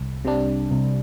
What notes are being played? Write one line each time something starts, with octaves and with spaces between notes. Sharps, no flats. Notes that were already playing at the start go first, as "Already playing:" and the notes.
Already playing: C2
C3 G3 D4
C2